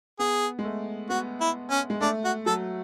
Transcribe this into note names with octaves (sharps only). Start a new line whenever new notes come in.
B3 G#4
G#3
A3
B3 F#4
E4
C#4
G#3
A3 D4
F#4
F#3 A4